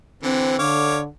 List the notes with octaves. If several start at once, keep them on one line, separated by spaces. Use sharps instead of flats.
D3 E3 C4
D3 C#5 F5 D6